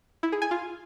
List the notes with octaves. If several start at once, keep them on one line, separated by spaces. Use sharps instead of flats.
E4
G#4
G#5
F4